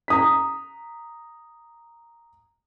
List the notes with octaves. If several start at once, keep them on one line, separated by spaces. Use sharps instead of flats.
A#5 D#6 B6